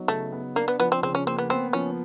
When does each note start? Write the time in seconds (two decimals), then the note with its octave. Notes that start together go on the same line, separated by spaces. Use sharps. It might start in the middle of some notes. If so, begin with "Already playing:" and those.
Already playing: F#3 B3 D#4
0.08 C#3 A3
0.32 B3
0.56 A#3 D4
0.68 B3
0.80 F3 B3
0.92 C4
1.03 C#3 C4
1.15 C#4
1.26 A#3 C4
1.38 B3
1.50 B3 C4
1.73 F3 C#4